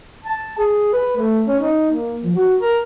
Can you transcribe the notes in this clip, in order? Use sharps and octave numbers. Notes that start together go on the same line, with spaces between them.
A5
G#4
B4
A3
C#4
D#4
A#3
F3
F#4
A#4